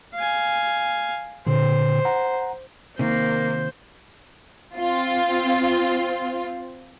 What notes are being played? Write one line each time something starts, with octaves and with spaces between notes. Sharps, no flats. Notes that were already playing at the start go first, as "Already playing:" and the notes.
F5 G#5
A#2 D3 C5
F#5 A#5
C3 D#3 A#3 C5
C4 F4